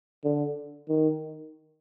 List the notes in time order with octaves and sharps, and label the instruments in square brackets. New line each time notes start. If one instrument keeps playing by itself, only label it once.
[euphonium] D3
D#3